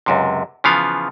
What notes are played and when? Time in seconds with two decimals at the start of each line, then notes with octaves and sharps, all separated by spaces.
0.06 C#2 F#2 C3
0.64 C#3 E3 F3 B3 F5